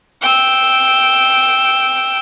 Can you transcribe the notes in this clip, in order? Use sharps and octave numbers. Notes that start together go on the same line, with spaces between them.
G5 E6